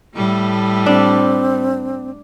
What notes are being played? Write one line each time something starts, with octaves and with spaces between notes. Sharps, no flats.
A2 G3 A3
C4 D4